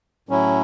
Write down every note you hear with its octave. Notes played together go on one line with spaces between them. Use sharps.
A2 F#3 C#4 E4